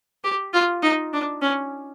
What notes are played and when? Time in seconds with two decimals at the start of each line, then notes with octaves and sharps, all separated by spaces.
0.24 G4
0.53 F4
0.83 D#4
1.13 D4
1.42 C#4